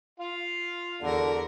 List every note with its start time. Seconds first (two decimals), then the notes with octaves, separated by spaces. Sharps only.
0.20 F4 F5
1.02 E2 D3 F#4 A#4